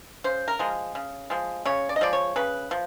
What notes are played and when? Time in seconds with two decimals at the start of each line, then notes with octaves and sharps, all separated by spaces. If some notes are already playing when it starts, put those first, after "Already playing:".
0.24 C#3 C5
0.48 A#4
0.59 F3 G#3
0.95 C#3
1.30 F3 G#3
1.65 C#3 C#5
1.89 D5
1.96 D#5
2.01 F3 G#3 D5
2.13 C#5
2.36 C#3 B4
2.71 F3